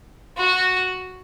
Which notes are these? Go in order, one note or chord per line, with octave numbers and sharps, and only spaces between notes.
F#4